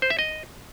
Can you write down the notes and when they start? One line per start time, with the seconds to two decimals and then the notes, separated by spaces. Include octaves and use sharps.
0.02 C5
0.10 E5
0.19 D#5